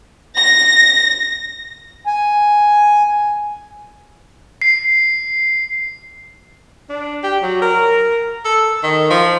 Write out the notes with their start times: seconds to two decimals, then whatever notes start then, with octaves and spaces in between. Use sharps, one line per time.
0.38 A#6
2.07 G#5
4.62 C7
6.89 D4
7.24 G4
7.43 F#3
7.62 A#4
8.45 A4
8.83 D#3
9.10 F3